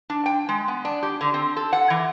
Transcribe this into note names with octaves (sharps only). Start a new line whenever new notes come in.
D4
G5
G#3
B3
D4
G4
D3
C4
A4
F#5
E3